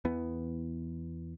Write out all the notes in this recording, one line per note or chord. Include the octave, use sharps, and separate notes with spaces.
E2 E3 B3